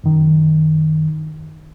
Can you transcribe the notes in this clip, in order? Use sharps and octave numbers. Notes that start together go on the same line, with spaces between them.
F#2 D#3